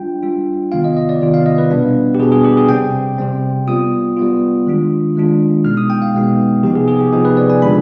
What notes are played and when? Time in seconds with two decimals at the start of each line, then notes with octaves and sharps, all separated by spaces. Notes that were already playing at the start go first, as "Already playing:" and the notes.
Already playing: G3 D4 F4 G5
0.23 G3 D4 F4
0.72 C3 D#3 B3 F4 F5
0.84 D#5
0.97 D#5
1.09 D5
1.21 C3 D#3 B3 F4
1.34 F5
1.46 D#5
1.58 B4
1.70 B2 G3 B3 D4
2.15 G4
2.20 B2 G3 B3 D4 G#4
2.32 G#4
2.44 G4
2.57 G#4
2.69 C3 G3 C4 G5
3.18 C3 G3 C4
3.67 G3 B3 F4 D#6
4.17 G3 B3 F4
4.66 D#3 G#3 D4 F4
5.16 D#3 G#3 D4 F4
5.65 B2 G#3 B3 D#4 F6
5.77 D#6
5.90 G5
6.02 F5
6.14 B2 G#3 B3 D#4
6.63 C3 F3 B3 D#4 G4
6.76 G#4
6.88 G#4
7.00 G4
7.12 C3 F3 B3 D#4 G#4
7.25 B4
7.37 D5
7.50 G#5
7.62 D3 F3 G#3 D4 B5